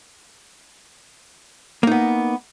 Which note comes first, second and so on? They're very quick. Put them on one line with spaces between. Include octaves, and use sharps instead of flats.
A#3 D#4 B3